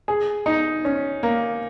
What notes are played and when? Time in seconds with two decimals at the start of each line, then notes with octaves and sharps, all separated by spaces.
0.08 G#4
0.46 D#4
0.85 C#4
1.23 A#3